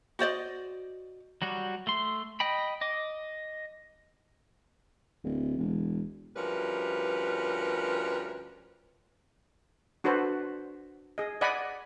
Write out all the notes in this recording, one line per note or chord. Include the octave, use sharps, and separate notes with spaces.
F#4 C5 D5 D#5
F#3 G3 F#4
A3 C6
D#5 G5 B5
D#5 D6
D1
E1
D2 F3 G3 C#4 A#4 B4
D4 F#4 A4 B4 C5
G#4 D#5
D5 D#5 F#5 G#5 B5